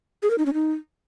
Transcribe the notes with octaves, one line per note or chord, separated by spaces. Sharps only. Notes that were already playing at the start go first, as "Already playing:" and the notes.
G#4
A#4
D#4
C#4
D#4